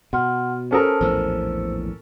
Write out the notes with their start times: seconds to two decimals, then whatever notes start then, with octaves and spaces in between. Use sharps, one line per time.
0.13 B2 F#5 C6 F6
0.71 C#4 A4 A#4 C5 A5 D#6
1.01 A#1 E2 A2 C5 E6